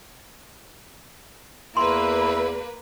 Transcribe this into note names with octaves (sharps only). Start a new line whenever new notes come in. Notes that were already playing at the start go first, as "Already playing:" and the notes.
E2 A#3 E4 B4 C6